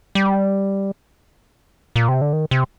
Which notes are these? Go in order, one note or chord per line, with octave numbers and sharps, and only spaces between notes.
G3
A#2
C3
D3
D#3
C3